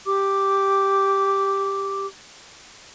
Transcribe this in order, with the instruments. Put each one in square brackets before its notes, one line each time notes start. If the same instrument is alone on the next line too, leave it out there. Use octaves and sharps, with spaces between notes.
[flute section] G4 D6